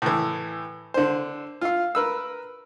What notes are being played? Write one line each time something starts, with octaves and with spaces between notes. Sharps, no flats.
A2 E3
D3 C5
F4 F5
A#4 B4 E6